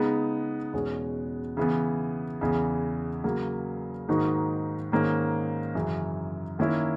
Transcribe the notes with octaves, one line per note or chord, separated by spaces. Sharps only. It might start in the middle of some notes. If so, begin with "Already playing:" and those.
Already playing: C#3 G#3 B3 D#4
E2 B2 G#3 C#4
C#3 E3 B3
E2 C#3 E3
C#3 F#3 A#3
G#2 D#3 A#3 D#4 F#4
G#2 D#3 A#3 C#4
F#2 C#3 E3
D#3 A#3 C#4 E4